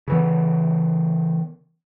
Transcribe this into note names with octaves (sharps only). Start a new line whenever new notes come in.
C#3 E3 B3